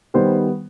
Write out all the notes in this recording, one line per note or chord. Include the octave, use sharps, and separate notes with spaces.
D#3 G3 B3 C5